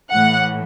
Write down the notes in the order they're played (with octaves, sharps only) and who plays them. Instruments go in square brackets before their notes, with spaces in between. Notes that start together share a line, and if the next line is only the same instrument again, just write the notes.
[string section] A2 E3 F#5